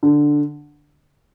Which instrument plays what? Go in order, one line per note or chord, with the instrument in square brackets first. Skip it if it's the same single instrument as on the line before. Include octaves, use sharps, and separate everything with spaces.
[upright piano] D3